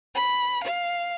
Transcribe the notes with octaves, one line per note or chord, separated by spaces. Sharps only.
B5
F5